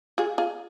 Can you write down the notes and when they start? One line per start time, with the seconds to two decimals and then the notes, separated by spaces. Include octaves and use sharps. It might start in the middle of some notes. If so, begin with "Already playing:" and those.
0.18 F4 G#4
0.38 F4 G#4